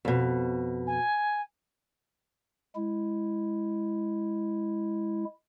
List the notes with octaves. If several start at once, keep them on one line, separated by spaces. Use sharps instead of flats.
F2 B2
G#5
G#3 E4